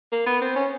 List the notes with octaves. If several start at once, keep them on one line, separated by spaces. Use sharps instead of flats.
A#3
B3
C4
C#4